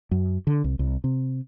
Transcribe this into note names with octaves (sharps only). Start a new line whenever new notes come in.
F#2
D3
C2
C2
C3